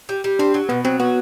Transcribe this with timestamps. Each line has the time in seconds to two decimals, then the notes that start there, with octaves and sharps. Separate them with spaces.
0.09 G3
0.24 G3
0.39 C4 D4
0.54 F#3
0.69 B2 B3
0.85 F#3 C4
1.00 B3 F#4